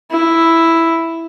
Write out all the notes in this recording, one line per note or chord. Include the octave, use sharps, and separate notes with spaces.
E4